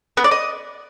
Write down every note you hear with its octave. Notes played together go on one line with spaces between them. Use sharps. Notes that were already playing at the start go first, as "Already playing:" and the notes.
B3
D5
D#5